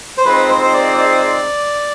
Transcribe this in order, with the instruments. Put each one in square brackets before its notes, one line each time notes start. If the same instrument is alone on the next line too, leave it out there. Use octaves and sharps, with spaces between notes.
[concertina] C5
[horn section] F3 G#3 C4 D#4 [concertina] B4
[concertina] C5
C5
D5
D5